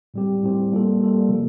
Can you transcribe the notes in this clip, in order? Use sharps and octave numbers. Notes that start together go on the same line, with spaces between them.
A2 G3 C4 G4
A2 G3 C4 G4
G3 A#3 F4 A4
G3 A#3 F4 A4
C3 F3 A#3 F4